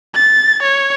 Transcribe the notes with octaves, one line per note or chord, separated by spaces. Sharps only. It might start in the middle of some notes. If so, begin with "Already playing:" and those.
A6
C#5